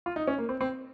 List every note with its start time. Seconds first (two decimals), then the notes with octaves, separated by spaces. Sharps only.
0.06 F4
0.16 D#4
0.27 C#4
0.38 A#3
0.49 C4
0.61 C4